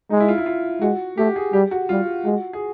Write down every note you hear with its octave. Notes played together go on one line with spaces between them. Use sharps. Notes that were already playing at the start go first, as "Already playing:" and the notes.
G#3 D#4
E4
F4
E4
F4
G#3 F#4
A3 G4
G#4
G3 G4
F#4
G3 F4
G#3 F#4
G#4